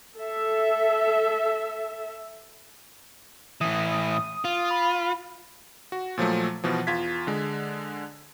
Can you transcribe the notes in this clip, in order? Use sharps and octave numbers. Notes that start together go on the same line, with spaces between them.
A4 E5
A2 E3 D#6
F4
B5
F#4
A#2 F3 F#3 A3
B2 E3 F3
E2 F4 G#6 B6
D3 G#3